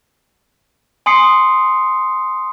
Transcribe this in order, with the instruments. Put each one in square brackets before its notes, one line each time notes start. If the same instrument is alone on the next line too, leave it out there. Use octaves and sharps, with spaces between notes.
[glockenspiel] G#5 C6 D#6 C7 C#7